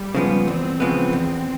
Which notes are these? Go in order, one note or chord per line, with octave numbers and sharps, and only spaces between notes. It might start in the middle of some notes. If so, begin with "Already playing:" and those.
Already playing: G3
C#3 F3 G#3 B3
E2 C4
C#3 F3 G#3 B3
E2